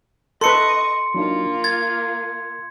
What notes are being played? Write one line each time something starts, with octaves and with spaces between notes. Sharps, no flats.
A4 B4 D#5 C6 C#6 C#7
F#3 A#3 D4 D#4 F4
G#6 A6